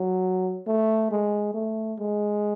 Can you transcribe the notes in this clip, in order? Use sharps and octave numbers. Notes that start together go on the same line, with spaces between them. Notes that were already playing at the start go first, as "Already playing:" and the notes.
Already playing: F#3
A3
G#3
A3
G#3